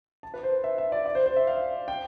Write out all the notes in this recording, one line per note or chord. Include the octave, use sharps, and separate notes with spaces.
A5
B4
C5
E5
E5
D5
D5
C5
C5
E5
F5
G5